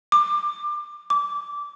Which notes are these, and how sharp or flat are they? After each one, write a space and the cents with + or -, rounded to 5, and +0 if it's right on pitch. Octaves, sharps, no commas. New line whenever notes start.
D6 +25
D6 -20